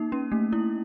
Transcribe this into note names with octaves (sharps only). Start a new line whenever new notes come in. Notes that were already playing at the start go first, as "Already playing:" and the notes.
Already playing: A#3 D#4
C#4
A3
E4